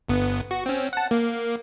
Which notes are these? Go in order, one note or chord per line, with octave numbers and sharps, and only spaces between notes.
G1 B3
F#4
C4 C#4
F#5 A5
A#3